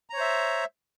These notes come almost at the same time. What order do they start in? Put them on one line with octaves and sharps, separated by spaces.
A#5 C#5 C5 E5